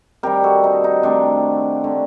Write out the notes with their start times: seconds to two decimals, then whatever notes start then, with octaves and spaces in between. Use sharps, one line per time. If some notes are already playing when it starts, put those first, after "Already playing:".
0.23 C3 D#3 G3 G4 A#4
0.44 F#4 A4
0.64 D#4
0.84 D#4
1.03 C3 D#3 A3 C4 D4
1.84 D3 A3